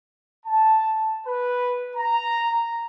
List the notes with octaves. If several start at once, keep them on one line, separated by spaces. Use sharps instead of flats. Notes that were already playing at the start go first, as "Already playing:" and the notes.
A5
B4
A#5